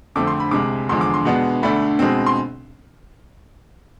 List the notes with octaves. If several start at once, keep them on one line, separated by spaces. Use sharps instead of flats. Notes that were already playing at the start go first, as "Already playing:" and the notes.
F2 D3 A3 C4 D6
C6
B5
C2 C3 G#3 D6
E2 D3 F3 G#3 C6
D6
C6
B2 G#3 B3 D4
D2 D3 A3 D4 B5
B2 G#3 C4
C6